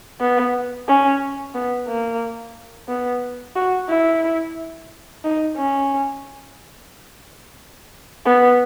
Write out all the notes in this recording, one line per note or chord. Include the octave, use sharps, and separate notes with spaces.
B3
C#4
B3
A#3
B3
F#4
E4
D#4
C#4
B3